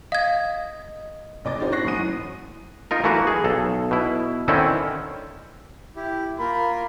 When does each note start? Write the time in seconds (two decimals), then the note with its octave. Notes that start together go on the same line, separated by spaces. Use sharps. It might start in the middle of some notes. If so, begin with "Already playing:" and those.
0.12 D#5 F5 G#6
1.45 F#1 D#5 D6 A6
1.59 C4 C#4 D#4 E4 F#4 C5
1.72 C#6 F#6 A#6 C7
1.84 F#2 A2 E3 F#5 D#6 D#7
2.91 D#4 F4 A#4
3.04 E3 A3 A#3 F#4 A#4 B4
3.27 G#4
3.44 B1 A4
3.91 B2 E4
4.48 D3 D#3 C4 C#4 E4 A4
5.96 E4 G4
6.39 A#3 F4 A#4 B5